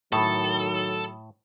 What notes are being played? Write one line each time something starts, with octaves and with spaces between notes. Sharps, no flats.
A2 D#3 F#3 A4 B5 D#6